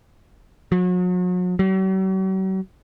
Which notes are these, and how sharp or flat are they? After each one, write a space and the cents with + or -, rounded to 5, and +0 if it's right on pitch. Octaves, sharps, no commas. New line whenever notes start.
F#3 -40
F#3 +45